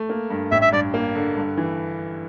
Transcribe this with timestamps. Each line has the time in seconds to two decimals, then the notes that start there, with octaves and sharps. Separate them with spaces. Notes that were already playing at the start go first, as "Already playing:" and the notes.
Already playing: A3
0.09 A#3
0.30 G2
0.51 A1 E5
0.62 E5
0.72 G2 D5
0.94 A#3
1.15 D3
1.36 G2
1.57 E3